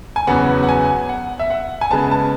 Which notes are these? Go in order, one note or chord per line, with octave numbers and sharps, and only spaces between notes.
G#5
E2 C#3 F#3 B3 F#5
F#5
G#5
F#5
E5
F#5
G#5
C#3 G#3 B3 A5
A5